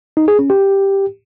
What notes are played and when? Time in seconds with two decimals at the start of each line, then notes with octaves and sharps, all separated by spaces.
0.17 D#4
0.28 G#4
0.39 C#4
0.50 G4